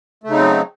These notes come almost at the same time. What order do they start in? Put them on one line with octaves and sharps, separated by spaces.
A3 C#3 D#4 C4 F#3